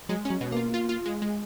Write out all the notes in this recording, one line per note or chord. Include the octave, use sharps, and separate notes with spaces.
F#3 G#3
C#4
F#3
B2
A#3 F4
F4
F4
G#3
G#3